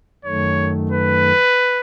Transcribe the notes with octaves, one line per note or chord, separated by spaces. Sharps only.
F#2 D#3 A3 C#5
B4